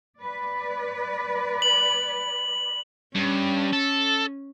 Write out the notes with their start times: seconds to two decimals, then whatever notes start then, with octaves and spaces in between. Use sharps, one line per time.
0.19 B4 D5
1.62 F#7
3.15 G2 C#4
3.73 A4